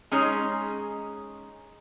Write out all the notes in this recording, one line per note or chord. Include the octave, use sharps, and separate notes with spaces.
G#3 C#4 D#4 G#4 C#5